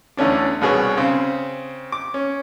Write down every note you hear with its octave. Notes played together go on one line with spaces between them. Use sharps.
E2 D3 A3 C#4 D4
C2 B2 G#4 C#5
C#3 C4
D6
C#4